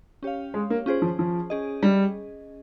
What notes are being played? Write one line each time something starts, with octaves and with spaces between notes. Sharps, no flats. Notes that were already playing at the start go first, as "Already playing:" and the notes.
C#4 G4 C#5 F5
G#3
A#3
C#4 F4 G#4 C5
F3
F3
C#4 G#4 D#5
G3